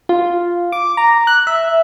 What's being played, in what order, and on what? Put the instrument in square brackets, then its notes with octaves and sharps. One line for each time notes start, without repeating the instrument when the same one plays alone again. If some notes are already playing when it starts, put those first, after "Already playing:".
[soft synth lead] F4
D6
A#5
F#6
E5